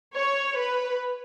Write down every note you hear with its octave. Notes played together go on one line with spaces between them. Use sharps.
C#5
B4